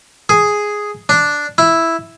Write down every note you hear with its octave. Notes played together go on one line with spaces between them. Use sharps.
G#4
D4
E4